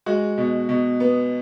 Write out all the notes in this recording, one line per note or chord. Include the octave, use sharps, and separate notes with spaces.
G#3 F#4
B2
B2
B3